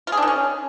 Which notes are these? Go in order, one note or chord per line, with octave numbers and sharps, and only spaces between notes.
F4
G#4
D4
D#3
C#4